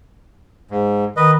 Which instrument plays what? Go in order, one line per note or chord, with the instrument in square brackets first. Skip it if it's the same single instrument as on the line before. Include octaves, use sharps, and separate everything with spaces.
[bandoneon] G#2
[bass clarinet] D#3 [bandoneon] B4 D#5